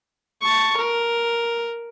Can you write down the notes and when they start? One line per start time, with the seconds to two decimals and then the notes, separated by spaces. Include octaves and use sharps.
0.41 A5 C#6
0.77 A#4